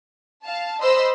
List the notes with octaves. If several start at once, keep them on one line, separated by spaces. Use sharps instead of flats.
F5 A5
B4 C5 D#5 B5 E6